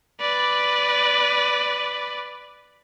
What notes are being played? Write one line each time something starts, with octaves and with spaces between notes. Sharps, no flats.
B4 D5